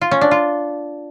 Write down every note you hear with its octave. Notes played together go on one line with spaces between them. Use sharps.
F4
C#4
D4
F4